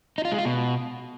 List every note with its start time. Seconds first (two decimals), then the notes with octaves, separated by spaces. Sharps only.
0.18 D#4
0.25 F4
0.32 G#3
0.38 F4
0.45 B2